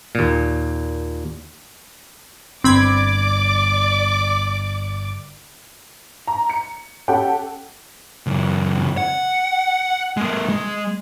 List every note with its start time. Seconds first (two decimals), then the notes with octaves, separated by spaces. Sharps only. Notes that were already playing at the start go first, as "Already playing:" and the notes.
0.15 D#2 A#2
2.64 G1 C4 D5 B5 D6 G#6
6.27 A#5
6.49 C#7
7.08 C#4 G4 A4 F#5 G5 A5
8.27 C#2 F#2
8.97 F#5
10.17 G#3 A#3
10.49 G#3